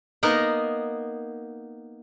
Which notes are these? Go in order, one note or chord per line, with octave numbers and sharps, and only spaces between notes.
A#3 B3 D#4 A#4